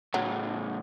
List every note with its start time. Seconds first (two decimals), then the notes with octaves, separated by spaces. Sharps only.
0.14 A2 C#3 F#3